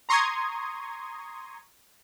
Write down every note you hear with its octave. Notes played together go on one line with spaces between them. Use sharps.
A#5 C6 C#6 D#6 G#6